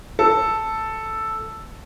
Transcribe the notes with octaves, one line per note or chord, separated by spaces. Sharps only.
A4